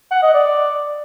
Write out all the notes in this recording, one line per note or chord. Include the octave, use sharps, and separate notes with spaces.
F#5
D#5
D5